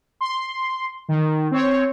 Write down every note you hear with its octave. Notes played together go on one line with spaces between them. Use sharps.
C6
D#3
C4 C#5